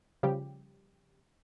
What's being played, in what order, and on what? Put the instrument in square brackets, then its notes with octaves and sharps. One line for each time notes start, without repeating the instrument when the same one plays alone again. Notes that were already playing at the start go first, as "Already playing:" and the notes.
[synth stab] C#3 F3 G3 G4